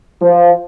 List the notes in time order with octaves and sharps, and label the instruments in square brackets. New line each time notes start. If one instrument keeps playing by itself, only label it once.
[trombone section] F3